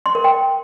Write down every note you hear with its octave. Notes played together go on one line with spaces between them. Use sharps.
C6
A#4
G5